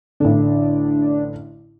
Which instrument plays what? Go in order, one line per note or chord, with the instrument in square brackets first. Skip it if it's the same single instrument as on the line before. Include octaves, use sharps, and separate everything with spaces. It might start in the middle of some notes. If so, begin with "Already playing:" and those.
[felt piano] A1 D3 [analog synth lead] D4